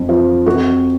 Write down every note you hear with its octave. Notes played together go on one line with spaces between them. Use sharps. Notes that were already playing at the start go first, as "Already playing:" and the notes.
Already playing: F2
F3
F2 F#4